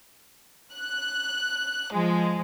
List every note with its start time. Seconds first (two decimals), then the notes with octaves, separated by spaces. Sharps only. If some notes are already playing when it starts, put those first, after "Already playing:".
0.72 F#6
1.93 F3 G#3